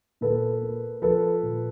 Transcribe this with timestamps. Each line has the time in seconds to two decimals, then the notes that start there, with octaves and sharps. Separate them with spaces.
0.21 A#2 A4 B4
0.61 A#3
1.02 F3 A4 B4
1.43 A#2